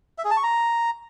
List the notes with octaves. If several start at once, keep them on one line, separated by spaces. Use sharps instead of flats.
E5
G#4
A5
C#6
A#5